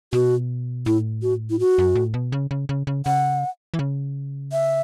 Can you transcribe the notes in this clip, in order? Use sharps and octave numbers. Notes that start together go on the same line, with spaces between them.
B2 F#4
A2 E4
F#4
E4
F#4
F#2
A2
B2
C#3
C#3
C#3
C#3
C#3 F#5
E3
C#3
E5